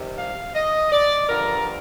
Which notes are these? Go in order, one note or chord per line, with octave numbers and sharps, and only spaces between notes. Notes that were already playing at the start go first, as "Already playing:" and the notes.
Already playing: C3 D#3 G3
F5
D#5
D5
G2 D3 F3 A#4